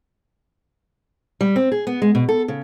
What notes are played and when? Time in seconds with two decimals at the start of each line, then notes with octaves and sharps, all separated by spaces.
1.41 G3
1.56 C4
1.72 G#4
1.87 B3
2.02 G#3
2.15 B2
2.29 A4
2.48 C#3